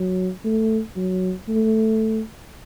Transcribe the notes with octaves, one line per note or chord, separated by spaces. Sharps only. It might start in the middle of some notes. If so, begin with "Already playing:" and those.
Already playing: F#3
A3
F#3
A3